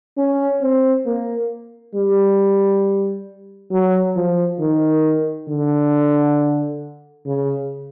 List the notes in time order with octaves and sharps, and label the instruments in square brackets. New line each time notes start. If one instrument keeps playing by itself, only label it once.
[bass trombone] C#4
C4
A#3
G3
F#3
F3
D#3
D3
C#3